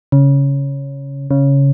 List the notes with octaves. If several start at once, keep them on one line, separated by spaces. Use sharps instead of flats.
C#3
C#3